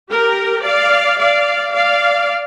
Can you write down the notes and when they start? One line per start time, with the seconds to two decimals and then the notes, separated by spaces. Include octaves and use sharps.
0.10 G4 A#4
0.64 D5 F5
1.19 D5 F5
1.73 D5 F5